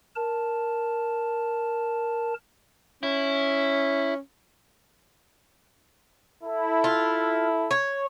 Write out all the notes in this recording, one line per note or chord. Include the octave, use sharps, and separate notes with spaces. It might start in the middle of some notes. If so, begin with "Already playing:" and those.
A#4 A5
C#4 E4
E4 A4
F4
C#5